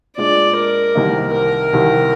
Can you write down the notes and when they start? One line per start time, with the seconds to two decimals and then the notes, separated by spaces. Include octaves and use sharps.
0.18 A#2 G#3 D4 D5
0.57 A#4
0.95 C2 C3 D#3 A#3 D#4
1.34 A#4
1.73 C2 C3 D#3